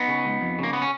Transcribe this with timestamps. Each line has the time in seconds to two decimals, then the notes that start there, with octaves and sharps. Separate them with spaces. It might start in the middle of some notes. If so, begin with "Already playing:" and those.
Already playing: B3 D#4
0.08 C#3
0.25 C#2
0.41 F2
0.59 C#3 A#3
0.73 B3
0.82 C#4